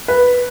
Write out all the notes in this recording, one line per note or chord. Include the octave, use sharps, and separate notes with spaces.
B4